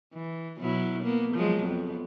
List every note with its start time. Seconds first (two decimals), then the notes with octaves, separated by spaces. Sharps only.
0.13 E3
0.59 B2 F#3 E4
1.03 A#3 B3
1.35 F3 F#3 G#3
1.63 F2 B3